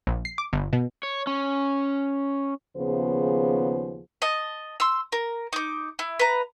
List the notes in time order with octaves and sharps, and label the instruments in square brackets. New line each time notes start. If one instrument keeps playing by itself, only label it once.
[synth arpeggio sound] A#1
C7
D6
G1
B2
[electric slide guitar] C#5
C#4
[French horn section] D#2 C#3 F3 B3 G#4 C5
[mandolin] D#5 A5
C6 E6
A#4
D#4 D6
E4
B4 A#5